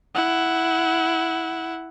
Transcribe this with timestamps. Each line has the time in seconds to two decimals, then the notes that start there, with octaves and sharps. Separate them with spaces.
0.15 E4 F#5